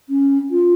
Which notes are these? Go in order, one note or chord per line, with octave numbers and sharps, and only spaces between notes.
C#4
F4